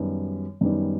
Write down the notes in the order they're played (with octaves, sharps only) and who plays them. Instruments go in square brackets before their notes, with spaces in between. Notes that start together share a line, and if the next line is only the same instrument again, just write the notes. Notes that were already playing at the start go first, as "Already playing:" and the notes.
Already playing: [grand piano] F#2 D#3 G3 B3
F#2 D#3 G3 B3